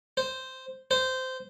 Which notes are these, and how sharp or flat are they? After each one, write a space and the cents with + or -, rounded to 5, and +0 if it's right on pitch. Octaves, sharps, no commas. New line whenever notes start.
C5 -5
C5 -15